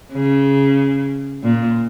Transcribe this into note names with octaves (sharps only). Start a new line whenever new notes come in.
C#3
A#2